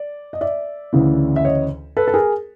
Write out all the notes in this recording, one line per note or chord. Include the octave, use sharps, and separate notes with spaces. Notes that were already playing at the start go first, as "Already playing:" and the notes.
Already playing: D5
D#5
D5 E5
D2 C#3 E3
E5
C#5 D#5
A4 B4
A4
G#4 A#4